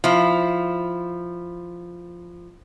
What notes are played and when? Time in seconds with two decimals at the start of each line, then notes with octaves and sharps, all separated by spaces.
0.04 F3 E4